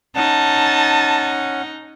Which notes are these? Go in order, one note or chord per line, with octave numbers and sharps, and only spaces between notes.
C#4 D#4 F#5 A5